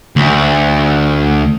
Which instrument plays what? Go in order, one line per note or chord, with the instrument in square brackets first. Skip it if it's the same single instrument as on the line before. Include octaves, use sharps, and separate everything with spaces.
[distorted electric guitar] D2